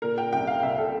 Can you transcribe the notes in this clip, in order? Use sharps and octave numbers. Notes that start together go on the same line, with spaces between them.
A#2 A#4
G5
C2 G5
F5
C2 E5
A4